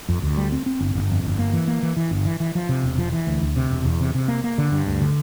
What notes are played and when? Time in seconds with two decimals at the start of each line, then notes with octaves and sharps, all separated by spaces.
0.09 F2
0.22 D2
0.37 G3
0.52 C4
0.66 C4
0.81 G1
0.95 G1
1.10 F2
1.23 G1
1.38 A#3
1.53 E3
1.68 A#3
1.83 E3
1.97 E3
2.11 G1
2.25 E3
2.40 E3
2.55 F3
2.69 C3
2.83 E1
2.98 F3
3.12 E3
3.27 D2
3.41 D2
3.56 C3
3.70 E1
3.85 E2
4.00 C3
4.14 C3
4.28 A#3
4.44 A#3
4.58 D3
4.72 G2
4.87 D2
5.01 D3